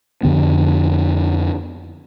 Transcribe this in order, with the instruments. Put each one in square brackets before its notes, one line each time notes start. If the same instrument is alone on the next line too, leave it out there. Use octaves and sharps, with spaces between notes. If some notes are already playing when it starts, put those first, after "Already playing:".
[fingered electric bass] F2 D3 B3